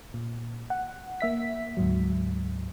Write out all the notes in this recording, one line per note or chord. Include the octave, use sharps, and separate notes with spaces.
A#2
F#5
A#3 E5 B6
D2 G#2 F#3